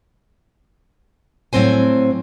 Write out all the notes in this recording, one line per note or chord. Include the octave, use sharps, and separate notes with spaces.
A2 F#3 C4 C5 G#5